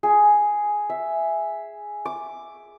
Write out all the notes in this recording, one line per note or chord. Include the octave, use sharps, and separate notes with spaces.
G#4
E5
D6